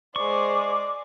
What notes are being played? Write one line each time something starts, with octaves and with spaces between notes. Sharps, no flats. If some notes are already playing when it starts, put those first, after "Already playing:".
G#3 C5 D5 C#6 D6